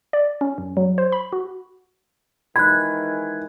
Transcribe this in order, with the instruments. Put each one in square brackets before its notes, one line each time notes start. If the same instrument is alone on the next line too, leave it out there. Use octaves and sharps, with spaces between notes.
[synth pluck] D5
C#4
F#2
F#3
C5
B5
F#4
[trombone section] D#3 E3 G#3 [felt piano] B5 [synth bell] F#6 G#6